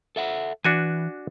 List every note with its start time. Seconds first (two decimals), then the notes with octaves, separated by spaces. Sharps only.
0.16 A4 E5 F#5
0.64 E3 D4 F#4 G#5